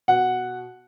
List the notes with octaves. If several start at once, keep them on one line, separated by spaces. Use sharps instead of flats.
B2 F#5